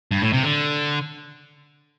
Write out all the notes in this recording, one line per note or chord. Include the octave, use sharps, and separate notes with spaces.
G2
A2
C3
D3